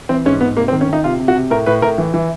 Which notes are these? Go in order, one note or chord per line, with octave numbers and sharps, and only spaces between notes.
E3 C4
G#2 C#4
G#2 B3
C3 A#3
C4
D#3
C#4
D#3 D#4
C3 F4
C3
F#4
C3
A2 A#4
A2 B4
A2 A#4
E3
E3